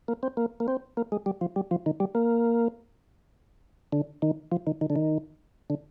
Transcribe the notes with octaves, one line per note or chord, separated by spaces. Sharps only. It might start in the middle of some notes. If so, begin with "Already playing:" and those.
A#3
C4
A#3
A#3
C4
A#3
G#3
G3
F3
G3
F3
D#3
G3
A#3
D3
D#3
F3
D#3
D#3
D3
D#3
D3